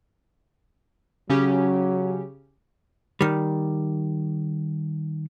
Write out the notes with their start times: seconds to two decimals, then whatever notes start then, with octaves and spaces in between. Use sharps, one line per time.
1.30 C#3 F#3 C#4 G4
3.21 D#3 G3